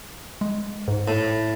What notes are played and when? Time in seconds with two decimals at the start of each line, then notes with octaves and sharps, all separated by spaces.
0.41 G#3
0.88 G#2
1.08 A2